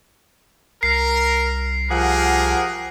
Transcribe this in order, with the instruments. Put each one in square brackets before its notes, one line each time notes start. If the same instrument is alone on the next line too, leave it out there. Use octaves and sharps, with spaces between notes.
[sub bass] C2 [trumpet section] A#4 [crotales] C7
[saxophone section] F3 F#5 [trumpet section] G4 G#4 A#4